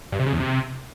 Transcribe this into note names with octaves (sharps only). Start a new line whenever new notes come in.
G2
C3
C#3
E2
C3